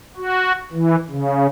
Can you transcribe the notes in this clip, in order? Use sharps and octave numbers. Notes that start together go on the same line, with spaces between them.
F#4
E3
C#3